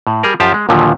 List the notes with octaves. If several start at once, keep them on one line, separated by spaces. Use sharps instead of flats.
A2
G3 G#4 A#4
F#2 F3 F4 G4 A5
G#3
D#2 A#2 D3 F3 F#3